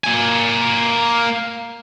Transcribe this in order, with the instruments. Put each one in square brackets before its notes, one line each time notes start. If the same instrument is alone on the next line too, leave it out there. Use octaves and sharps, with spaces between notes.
[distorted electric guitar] A#3 G#5